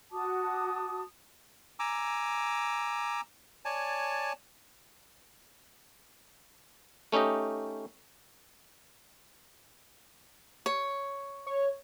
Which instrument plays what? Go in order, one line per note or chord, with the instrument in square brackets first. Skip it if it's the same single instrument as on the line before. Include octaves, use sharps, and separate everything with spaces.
[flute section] F#4 A5 D6 D#6
[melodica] G#5 A#5 D6 E6
C#5 D5 G#5 A5
[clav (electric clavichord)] A3 C#4 D#4 G4 D#5
[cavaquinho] C#5
[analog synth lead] C#5